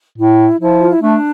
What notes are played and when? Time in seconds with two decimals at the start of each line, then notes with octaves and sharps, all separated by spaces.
0.18 A2 E4
0.59 F3 E4
0.79 F4
0.90 E4
1.02 A3 D4